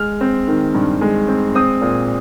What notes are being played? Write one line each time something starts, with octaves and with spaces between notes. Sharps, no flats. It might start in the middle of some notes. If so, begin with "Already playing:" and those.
Already playing: G#3 F6
C4
D#3
G2
G#3
C4
C4 D#6
A#2